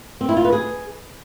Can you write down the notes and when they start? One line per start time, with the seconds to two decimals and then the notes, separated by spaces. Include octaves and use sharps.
0.21 C4
0.29 E4
0.37 F4
0.45 B4
0.53 G#4